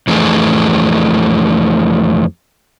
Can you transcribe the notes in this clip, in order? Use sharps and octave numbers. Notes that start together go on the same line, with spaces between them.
F2 E3 A3 G#4